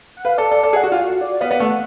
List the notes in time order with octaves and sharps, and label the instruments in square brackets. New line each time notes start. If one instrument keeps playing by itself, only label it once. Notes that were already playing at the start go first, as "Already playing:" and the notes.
[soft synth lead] F#5
[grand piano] B4 [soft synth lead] F5
[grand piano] A4 [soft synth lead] D5
[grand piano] A4 [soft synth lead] D5
[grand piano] A4 [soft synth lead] D5
[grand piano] G#4
[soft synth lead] F#5
[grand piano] F#4
F4
[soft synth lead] F#4
D5
[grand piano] B3 [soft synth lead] F5
[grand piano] B3
[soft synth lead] F5
[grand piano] A3
[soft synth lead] F#5